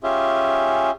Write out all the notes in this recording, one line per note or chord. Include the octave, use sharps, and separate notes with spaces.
C#4 F4 G4 G#4 E5